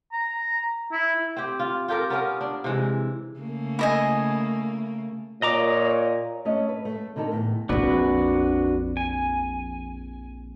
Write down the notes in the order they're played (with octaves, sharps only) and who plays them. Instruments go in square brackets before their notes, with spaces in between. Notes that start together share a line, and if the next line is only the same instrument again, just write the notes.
[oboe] A#5
E4
[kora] C4 G4
F4
F4 G4 A4 A#4
B3 C#4 A#4
D4
C3 E3 G#3
[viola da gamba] C#3 A3 A#3
[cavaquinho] E4 D#5 G#5
[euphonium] A#2 [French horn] C#5 [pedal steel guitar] D#5 A#5 D6
[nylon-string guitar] A3 C#4 C#5 D#5
B4
A3
D3 D#3 D#4 A4 A#4
E2 A2
[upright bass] A#1 F2 [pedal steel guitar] D4 F#4 B4
[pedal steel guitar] G#5